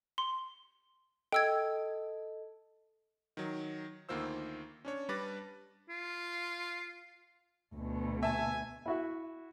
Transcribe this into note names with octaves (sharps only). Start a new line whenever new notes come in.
C6
A4 D#5 G5 E6 G#6
D#3 F#3
D2 D#3 A#3 F4 C5 E6
C#4 D4 C#5
G3 D4 B4 D6 A6 A#6
F4
D2 B2
E5 G#5 A5
E4 F#4 E5